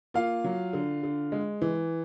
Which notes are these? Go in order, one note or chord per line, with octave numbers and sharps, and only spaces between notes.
A#3 F4 F5
F#3
D3
D3
G#3
E3